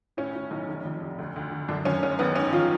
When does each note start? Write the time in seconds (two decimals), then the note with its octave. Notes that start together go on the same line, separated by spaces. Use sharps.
0.17 A2 C#4
0.35 A2
0.51 B1
0.69 F1
0.85 F2
1.02 F1
1.18 D2
1.36 D2
1.52 D3
1.68 F#2 D3 D4
1.85 F#2 C#4
2.02 F#1 C#4
2.19 A1 B3
2.36 G#2 C#4
2.52 F3 F4